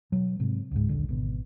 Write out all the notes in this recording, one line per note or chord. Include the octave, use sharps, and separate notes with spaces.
B2 F#3
G#2 C3
C#2 G#2
D#1 A#1 D3
G#1 B2